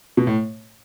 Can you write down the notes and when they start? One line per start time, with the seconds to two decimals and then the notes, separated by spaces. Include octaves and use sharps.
0.17 B2
0.27 A2